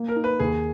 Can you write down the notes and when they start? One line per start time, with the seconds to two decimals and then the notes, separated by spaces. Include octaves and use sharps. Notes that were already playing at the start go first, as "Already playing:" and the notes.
Already playing: A#3
0.08 A#4
0.16 D#4
0.24 B4
0.40 D#2 G#4